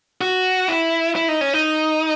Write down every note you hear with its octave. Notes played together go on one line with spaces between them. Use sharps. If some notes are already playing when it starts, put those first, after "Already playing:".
F#4
E4
E4
D#4
C#4
D#4